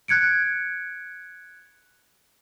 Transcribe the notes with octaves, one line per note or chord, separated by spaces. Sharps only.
F#6 G#6 C#7 D7